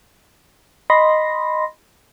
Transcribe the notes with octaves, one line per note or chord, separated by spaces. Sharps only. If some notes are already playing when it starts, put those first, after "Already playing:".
D#5 B5 C6 A#6